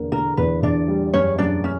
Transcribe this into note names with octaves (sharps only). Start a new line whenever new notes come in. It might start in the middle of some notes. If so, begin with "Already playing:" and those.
Already playing: E2 D3 A#3
D3 A#4
E2 B4
E2 D4 D5
G3
F#2 C#4 C#5
F#2 D4 D5
C#4